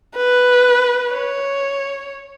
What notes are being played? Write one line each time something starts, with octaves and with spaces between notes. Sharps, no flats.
B4
C#5